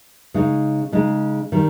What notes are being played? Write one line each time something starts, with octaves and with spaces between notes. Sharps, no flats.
C#3 G#3 D#4
C#3 G#3 D#4
D#3 G3